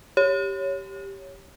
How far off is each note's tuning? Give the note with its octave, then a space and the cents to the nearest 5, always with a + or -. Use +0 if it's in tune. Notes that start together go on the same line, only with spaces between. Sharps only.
G4 +0 C#5 +0